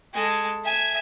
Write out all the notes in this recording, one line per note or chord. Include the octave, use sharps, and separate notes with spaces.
G#3 A4
E5 G#5